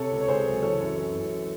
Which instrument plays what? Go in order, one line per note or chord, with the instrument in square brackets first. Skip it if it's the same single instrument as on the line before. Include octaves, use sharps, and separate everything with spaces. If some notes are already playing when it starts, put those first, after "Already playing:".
Already playing: [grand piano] C3 A4 C#5
C#2
C#5
C#2 G#4 C5
F#3
E3 A4 C#5
F#2
E3
F#2